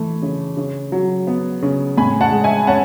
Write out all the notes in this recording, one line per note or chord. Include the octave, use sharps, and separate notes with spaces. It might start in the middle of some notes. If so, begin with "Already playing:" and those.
Already playing: E3 A3
C#3
C#3
F#3
B3
C#3
A2 G#5 B5
F#5 A5
G#3
E5 G#5
C#4 F#5 A5